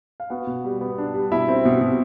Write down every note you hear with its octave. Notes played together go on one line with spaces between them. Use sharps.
F5
B3 F#4 F#5
B2
G3
B3
D4
G3
B2 E4 E5
C4
B2
B2